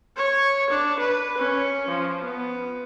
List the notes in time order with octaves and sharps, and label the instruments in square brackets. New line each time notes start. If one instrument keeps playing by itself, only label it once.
[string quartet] C#5
D4
B4
C#4
F3
B3